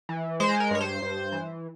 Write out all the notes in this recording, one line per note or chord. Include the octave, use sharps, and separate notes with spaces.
E3
G#3 C5
A#4
G2 C#5
C5
G2
E3